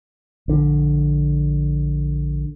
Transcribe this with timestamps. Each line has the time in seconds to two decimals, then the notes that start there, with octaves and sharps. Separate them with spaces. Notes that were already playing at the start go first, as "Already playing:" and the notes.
0.48 A#1 D3